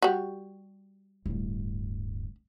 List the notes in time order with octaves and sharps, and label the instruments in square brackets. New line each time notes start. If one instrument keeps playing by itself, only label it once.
[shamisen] G3 F#4
[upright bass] D1 G2